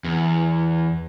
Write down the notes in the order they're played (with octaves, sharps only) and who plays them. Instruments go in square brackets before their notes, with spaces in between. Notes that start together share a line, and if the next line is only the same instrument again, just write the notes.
[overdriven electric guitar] E2